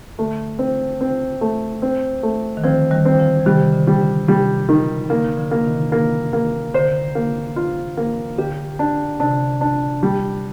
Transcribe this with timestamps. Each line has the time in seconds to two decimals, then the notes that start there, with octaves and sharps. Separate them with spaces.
0.18 D3 A3
0.59 C4
1.01 C4
1.41 A3
1.82 C4
2.23 A3
2.57 D#3
2.64 D3 F3 C4
2.91 D#3 G3
3.05 C4
3.18 D3 F3
3.40 F3
3.46 C3 D#3 G3
3.73 D3
3.87 G3
4.01 D3
4.28 C3 G3
4.69 D#3
5.10 D3 A#3
5.37 D3 F3
5.51 A#3
5.64 C3 D#3
5.92 A#3
6.33 A#3
6.74 D3 C5
7.15 A#3
7.56 F4
7.97 A#3
8.38 D3 G4
8.79 D4
9.20 C3 D4
9.61 D4
10.03 G3